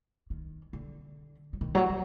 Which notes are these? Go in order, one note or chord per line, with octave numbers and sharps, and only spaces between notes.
D#3
D3
F#3
D#3
F#3
D#3